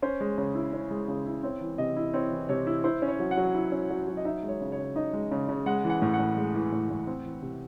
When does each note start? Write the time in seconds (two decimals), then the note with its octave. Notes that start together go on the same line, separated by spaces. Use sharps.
0.02 C#4 C5
0.20 G#3
0.38 C#3
0.55 E4
0.73 C#4
0.91 G#3
1.08 C#3
1.26 E4
1.43 C4 C#5
1.61 E3
1.78 C3 D#5
1.96 E4
2.14 C4 C#5
2.31 E3
2.49 C3 C#5
2.67 E4
2.84 E4 C5
3.02 C#4
3.08 C#5
3.20 F#3
3.31 F#5
3.37 F#3
3.55 E4
3.72 C#4
3.90 F#3
4.08 F#3
4.17 D#5
4.25 D#4 E5
4.43 G#3
4.48 C#5
4.61 C#3
4.72 C#5
4.78 C#3
4.96 D#4 D#5
5.13 G#3
5.32 C#3
5.49 C#3
5.66 G#3 F#5
5.84 E3
5.90 F#5
6.02 A2
6.13 F#5
6.19 A2
6.37 G#3
6.54 E3
6.72 A2
6.90 A2
7.07 C4
7.25 E3
7.42 C3